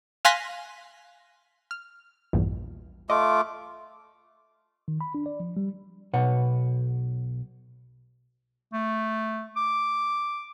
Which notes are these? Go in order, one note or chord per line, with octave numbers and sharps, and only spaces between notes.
F5 G#5 C6 F#6 A#6 B6
F6
A#1 E2 G2
A3 F4 D#5 D6
D#3
B5
D4
D5
F3
G3
B1 B2 B4 C#5 F#5
A3
D6